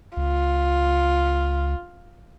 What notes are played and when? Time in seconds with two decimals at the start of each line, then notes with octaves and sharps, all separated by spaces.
0.17 C#2 F4